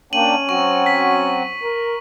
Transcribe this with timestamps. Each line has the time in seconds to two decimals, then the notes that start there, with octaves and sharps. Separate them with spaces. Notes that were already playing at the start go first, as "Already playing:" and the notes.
0.13 A#3 C#4 D4 G4 D#7 F#7
0.49 F#3 C4 F#4 C#6
0.86 B6
1.63 A#4